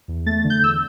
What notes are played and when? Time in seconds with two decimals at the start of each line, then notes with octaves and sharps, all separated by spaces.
0.08 E2
0.26 A3 A6
0.44 D3
0.50 G6
0.63 E2 E6